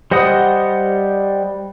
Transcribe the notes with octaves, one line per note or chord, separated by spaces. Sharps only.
G3 C5 D#5 F#5 D#6